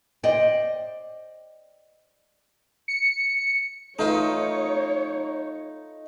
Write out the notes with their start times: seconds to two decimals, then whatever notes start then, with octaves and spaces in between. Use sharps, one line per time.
0.23 C5 D5 D#5 G5
2.88 C#7
3.99 A3 D#4 F4 B4 C#5